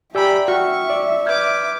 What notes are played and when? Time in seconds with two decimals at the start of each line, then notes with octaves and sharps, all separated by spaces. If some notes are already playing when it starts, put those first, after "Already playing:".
0.15 G4 D5 E5 G5 G#5 A#5 B5 E6
0.48 F#4 G5 C#6 F6
0.90 F#4 D5
1.26 B4 D6 F6 G6 G#6